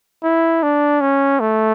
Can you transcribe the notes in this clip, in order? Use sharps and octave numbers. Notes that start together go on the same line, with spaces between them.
E4
D4
C#4
A3